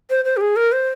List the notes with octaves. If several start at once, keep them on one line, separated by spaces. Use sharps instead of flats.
C5
C5
G4
G#4
A#4
C5